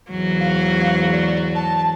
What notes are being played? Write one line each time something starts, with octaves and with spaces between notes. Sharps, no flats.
E2 G#2 F#3
F5
D5
A5